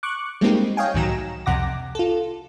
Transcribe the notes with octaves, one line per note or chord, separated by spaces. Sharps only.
C#6 D6 F#6
G3 G#3 A#3 C4 D#4 G4
C#5 D#5 F5 G5 G#5
C2 A2 D#3 F#3 A#5 E7
C2 F2 C3 F#5 D6 A#6
F4 A4